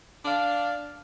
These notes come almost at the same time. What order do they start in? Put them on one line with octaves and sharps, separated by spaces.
D4 D5 F5